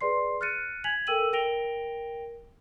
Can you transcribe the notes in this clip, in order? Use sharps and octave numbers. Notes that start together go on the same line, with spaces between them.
G#4 B4 D5 C6 C7
F6 F#6 A6 C#7 D#7
G#5 G#6 B6 F7 F#7
A4 A#4 G5 E6 D#7 F#7
A#4 G5 A#6 D7 F7 G7